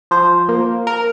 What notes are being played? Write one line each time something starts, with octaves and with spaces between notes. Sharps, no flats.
F3 C5
A#3
A#4